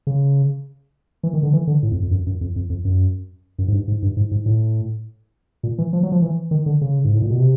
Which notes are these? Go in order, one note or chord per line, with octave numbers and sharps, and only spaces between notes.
C#3
E3
D#3
D3
E3
D3
A2
F2
F2
F#2
F#2
F2
F2
F2
F#2
F#2
G#2
G2
G#2
G2
G#2
G#2
A2
A#2
E3
F3
F#3
F3
E3
D#3
D3
C#3
G#2
A2
A#2
B2
C3